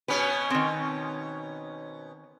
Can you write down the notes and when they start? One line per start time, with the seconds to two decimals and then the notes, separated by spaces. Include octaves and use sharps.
0.08 B2 B3 C#4 B4
0.50 D#3 C4